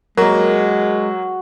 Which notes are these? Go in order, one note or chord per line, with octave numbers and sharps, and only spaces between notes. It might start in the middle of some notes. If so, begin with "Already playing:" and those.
F#3 G#3 A#3 F#4 A#4 A#5